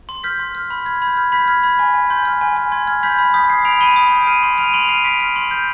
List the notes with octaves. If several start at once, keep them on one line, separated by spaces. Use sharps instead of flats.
C6
F6 G6 B6
C6
F6
B5
F6 G#6
G#6
B5
G6
F6 G#6
B5 G6 B6
F6 G#6
B5 G#6
G#5
G#5
C6 G6
F6
G#5
G#5
C6 G#6
F6 G#6
B5 G6 B6
B5
D#6 G6 B6
G6 G#6 C7
B5 D7 F7
B5 D#7 G7
D#6
G6
D7
F6 C7 D#7
C6
F6 D7 F7
D#7
C6 D7 F7
F7
F6 C7 D#7
C6 B6 D7
F6
C6
G6